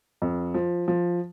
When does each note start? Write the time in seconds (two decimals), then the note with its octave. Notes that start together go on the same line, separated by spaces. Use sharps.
0.22 F2
0.54 F3
0.88 F3